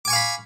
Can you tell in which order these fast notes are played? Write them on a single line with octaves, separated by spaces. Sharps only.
D6 G#5 C#6 F5 B5